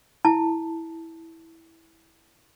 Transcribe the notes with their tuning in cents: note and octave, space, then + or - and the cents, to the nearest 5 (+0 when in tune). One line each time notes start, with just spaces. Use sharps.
E4 -10 A5 +0